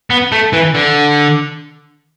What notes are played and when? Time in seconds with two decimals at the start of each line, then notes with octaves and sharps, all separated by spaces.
0.10 B3
0.32 A3
0.53 E3
0.75 D3